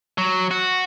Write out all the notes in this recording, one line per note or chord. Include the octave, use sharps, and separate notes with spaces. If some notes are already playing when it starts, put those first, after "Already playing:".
F#3
F#4